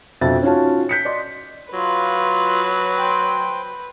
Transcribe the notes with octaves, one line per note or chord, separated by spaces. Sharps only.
F2 B2 F3 D4 E5 A6
C#4 D#4 F4 F#4 C#5 A5
G6 B6 C#7
D5 D#5 C6
F#3 F4 B4
C5 G5